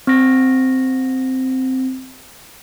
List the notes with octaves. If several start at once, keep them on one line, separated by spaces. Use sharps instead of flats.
C4 A#6